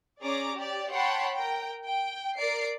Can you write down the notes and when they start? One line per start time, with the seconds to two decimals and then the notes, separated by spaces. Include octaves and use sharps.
0.21 C#4 G#4 D5 A#5 D6
0.55 G4 D5
0.91 C#5 F#5 G5 A5 B5 C6
1.33 A#4 G5
1.84 G5
2.38 A#4 D5 C7 D7